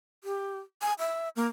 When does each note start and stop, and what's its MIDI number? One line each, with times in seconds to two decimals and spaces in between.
0.24 0.59 67
0.82 0.93 80
0.99 1.29 76
1.36 1.47 58